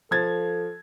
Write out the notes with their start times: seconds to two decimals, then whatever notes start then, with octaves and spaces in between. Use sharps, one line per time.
0.11 F3 A4 G#6 A6